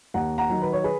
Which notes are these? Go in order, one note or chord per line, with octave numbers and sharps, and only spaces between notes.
D#2 F#5 A#5
F#5 A#5
D#3 F#3
B4
C#5
G#4 B4